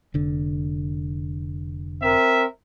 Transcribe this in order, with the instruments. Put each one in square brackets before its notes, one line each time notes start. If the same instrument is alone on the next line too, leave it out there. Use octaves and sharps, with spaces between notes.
[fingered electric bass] F1 D3
[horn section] C4 A#4 E5